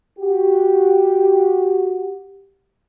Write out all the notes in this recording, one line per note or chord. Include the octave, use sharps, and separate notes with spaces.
F#4 G4